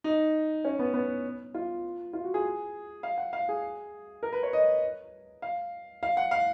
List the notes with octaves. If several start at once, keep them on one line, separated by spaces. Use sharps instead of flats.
D#4
C#4
B3
B3
F4
F4
F#4
G#4
F5
F#5
F5
G#4
A#4
B4
C#5
D#5
F5
F5
F#5
F5